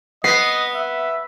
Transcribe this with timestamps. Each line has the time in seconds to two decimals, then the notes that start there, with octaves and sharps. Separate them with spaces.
0.24 B3 D#5 C7
0.75 E5